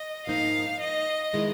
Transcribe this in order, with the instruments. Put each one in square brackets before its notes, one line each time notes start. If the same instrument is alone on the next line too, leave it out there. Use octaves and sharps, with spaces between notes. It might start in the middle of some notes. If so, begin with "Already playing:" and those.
Already playing: [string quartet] D#5
[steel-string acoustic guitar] G#2 F3 A#3 D#4 [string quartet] F5
[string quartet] D#5
[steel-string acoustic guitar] D#3 G#3 B3 E4